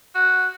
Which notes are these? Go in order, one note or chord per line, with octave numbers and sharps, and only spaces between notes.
F#4